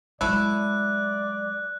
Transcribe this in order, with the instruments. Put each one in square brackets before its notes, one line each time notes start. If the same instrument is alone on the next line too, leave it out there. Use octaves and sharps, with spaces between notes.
[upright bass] F#3 G#3 [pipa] A3 E4 [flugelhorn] D5 [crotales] F#6